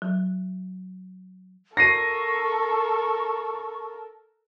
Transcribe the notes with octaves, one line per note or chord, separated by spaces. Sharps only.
F#3
A4 A#4 C#6 A#6 C7 D#7